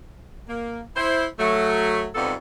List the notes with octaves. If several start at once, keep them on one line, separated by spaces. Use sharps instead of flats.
A#3
E4 C5
F#3 A3
G#2 C3 G3 B3 F4 A4